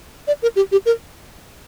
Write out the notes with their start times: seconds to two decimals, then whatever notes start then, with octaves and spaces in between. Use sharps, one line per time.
0.27 D5
0.42 A#4
0.56 G4
0.72 G4
0.86 A#4